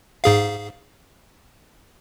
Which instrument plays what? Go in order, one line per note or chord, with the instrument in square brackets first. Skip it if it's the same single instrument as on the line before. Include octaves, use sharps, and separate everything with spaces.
[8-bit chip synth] G#2 G#4 F5